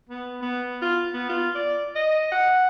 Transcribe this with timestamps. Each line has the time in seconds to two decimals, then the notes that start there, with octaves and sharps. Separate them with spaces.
0.09 B3
0.42 B3
0.82 F4
1.14 B3
1.29 F4
1.55 D5
1.95 D#5
2.32 F#5